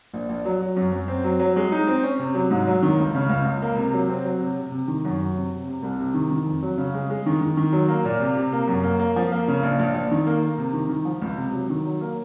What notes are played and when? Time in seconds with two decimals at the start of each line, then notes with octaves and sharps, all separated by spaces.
0.14 A#1
0.29 A#1
0.45 F#3
0.60 F#3
0.76 F#2
0.92 F#2
1.08 C4
1.24 F#3
1.39 F#3
1.56 G#3
1.72 D#4
1.87 C4
2.03 C#4
2.19 C3
2.35 F#3
2.50 G#2
2.67 F#3
2.82 D#3
2.98 C#2
3.15 C#3
3.29 C#2
3.45 C#2
3.62 A#3
3.77 C3
3.93 F#3
4.09 C4
4.24 F#3
4.40 C3
4.57 C3
4.72 C3
4.88 D#3
5.05 F#2
5.20 F#3
5.36 C3
5.51 C3
5.67 C3
5.83 C2
5.99 C3
6.14 D#3
6.31 D#3
6.46 F2
6.63 F#3
6.78 C#3
6.94 G#3
7.10 G#3
7.26 D#3
7.41 D#3
7.57 D#3
7.73 F#3
7.88 A#3
8.05 A#2
8.20 C3
8.37 C3
8.52 A#3
8.68 F#2
8.83 A#3
8.99 A#3
9.16 F3
9.32 A#3
9.48 C#3
9.63 A#1
9.79 A#1
9.94 A#1
10.11 D#3
10.26 A#3
10.42 A#3
10.58 C3
10.73 D#3
10.89 D#3
11.05 F3
11.22 C#2
11.37 C3
11.53 F#3
11.70 D#3
11.85 F#3
12.01 A#3